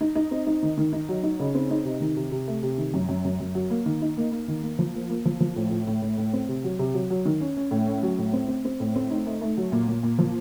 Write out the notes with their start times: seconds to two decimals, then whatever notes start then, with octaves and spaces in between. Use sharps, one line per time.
0.01 D#4
0.15 D#4
0.31 C4
0.47 D#4
0.62 D#3
0.77 D#3
0.93 D#4
1.09 F#3
1.23 D#4
1.39 C#3
1.55 C4
1.71 D#4
1.85 C3
2.00 D#3
2.16 C3
2.32 C3
2.47 A3
2.63 C3
2.78 D#3
2.94 F#2
3.09 F#2
3.25 F#2
3.40 F#2
3.55 F#3
3.70 A#3
3.86 D#3
4.02 D#4
4.17 A#3
4.32 A#3
4.48 D#3
4.63 A#3
4.79 F3
4.95 A#3
5.09 A#3
5.25 F3
5.40 F3
5.56 A2
5.71 A2
5.87 A2
6.02 A2
6.17 A2
6.33 C4
6.49 C3
6.64 F#3
6.79 C3
6.94 F#3
7.10 F#3
7.25 D#3
7.40 C#4
7.57 C#4
7.71 A2
7.86 C#4
8.03 F#3
8.18 A2
8.33 C4
8.48 C4
8.65 C4
8.80 A2
8.96 C4
9.11 D#4
9.26 A3
9.41 A3
9.57 F#3
9.72 A#2
9.88 A#2
10.03 A#2
10.19 F3